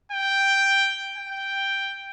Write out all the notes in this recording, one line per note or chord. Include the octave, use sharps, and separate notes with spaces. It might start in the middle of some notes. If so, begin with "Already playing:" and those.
G5
G5